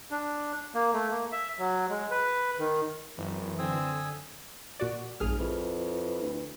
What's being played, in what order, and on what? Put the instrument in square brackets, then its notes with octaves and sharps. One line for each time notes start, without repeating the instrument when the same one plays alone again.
[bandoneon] D4
A#3
A3
A#3
E5
F#3
G#3
B4
D#3
[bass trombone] G#1 [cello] F#2 [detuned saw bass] E3
[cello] D3 [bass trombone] C4 [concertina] G#5 D#6 E6
[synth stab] A#2 F#4 D5
[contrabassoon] F1 [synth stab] A#1 G#4 F6 [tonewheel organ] G2 G#3
[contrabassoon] F2 [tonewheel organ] E4 B4
[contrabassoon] D2